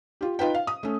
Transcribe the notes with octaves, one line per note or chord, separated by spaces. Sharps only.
F4 G4
D#4 F4 B4 G5
F5
D#6
A3 C#4